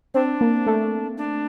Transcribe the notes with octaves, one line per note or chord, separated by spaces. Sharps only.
C4 D4
A#3
A3
D4